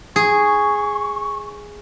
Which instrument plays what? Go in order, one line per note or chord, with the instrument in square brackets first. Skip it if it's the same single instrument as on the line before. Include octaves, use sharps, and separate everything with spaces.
[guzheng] G#4 [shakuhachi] C#6